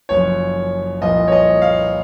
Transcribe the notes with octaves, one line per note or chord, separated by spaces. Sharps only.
F#1 F#2 F3 C#5
C2 A#2 F3 D#5
C#5
D#5
F5